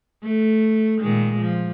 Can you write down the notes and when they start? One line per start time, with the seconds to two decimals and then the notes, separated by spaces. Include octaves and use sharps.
0.23 A3
1.01 A#2 D#3 G#3
1.39 F3